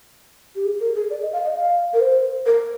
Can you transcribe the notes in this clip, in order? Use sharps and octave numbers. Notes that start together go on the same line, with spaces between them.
G4
G#4
A#4
G#4
D5
D#5
F5
D#5
F5
A#4
C5
A#4